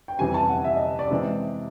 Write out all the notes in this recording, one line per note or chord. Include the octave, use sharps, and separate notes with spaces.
G5
F2 C3 E3 G3 G#5
A5
F#5
E5
D#5
D5
C3 E3 G#3 C4